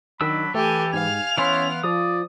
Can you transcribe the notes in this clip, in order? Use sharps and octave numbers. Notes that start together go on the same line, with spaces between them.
D#3 F#3 D4 B5 E6
E3 A3 G4 A4 G#5
G#2 F5 G#5 F7
E3 B3 C#4 E4 C6
F3 D5 D#6